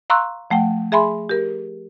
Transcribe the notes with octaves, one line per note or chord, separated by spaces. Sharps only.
F5 A#5 C6 C#6 E6 F#6
F3 A3 F#5 G5
G#4 E5 G#5 B5 C6
G4 A#4